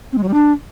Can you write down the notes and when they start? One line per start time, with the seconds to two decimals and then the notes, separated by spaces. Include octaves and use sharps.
0.12 C4
0.18 G#3
0.23 F#3
0.28 G3
0.33 D4